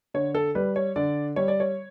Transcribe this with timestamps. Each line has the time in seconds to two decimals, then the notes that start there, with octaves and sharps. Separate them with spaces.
0.14 D3 C#5
0.35 A4
0.55 G3 B4
0.76 C#5
0.96 D3 D5
1.36 G3 C#5
1.48 D5
1.60 C#5